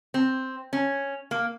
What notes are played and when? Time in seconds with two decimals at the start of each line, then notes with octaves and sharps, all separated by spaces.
0.14 C4
0.73 C#4
1.31 A#3